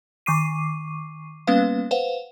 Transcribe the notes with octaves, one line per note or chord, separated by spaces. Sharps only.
D#3 C#6 D6 C7 D#7
G3 A#3 B3 C#4 B4 F5
B4 C5 F5 F#5